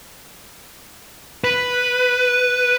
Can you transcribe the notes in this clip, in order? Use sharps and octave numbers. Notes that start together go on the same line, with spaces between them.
B4